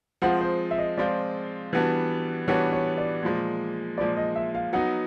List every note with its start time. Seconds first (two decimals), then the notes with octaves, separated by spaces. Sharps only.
0.22 F3 G#3 C4 F4 F#5
0.41 C5
0.71 E5
0.78 D#5
0.97 F3 G#3 C4 F4 D5
1.73 E3 G3 B3 D4 F#4
2.48 E3 G3 B3 D4 F#4 C#5
2.73 C#5
2.98 D5
3.22 A#2 F3 G#3
3.98 A#2 F3 G#3 D5
4.17 D#5
4.36 E5
4.55 F5
4.73 F#3 B3 D#4 F#5